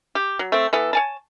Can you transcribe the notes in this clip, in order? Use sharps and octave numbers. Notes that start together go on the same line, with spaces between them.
G4
F#3
A3 C4
E3 B3 A4
C#5 G#5 A5